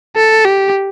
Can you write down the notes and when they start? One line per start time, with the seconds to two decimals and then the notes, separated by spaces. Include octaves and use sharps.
0.16 A4
0.45 G4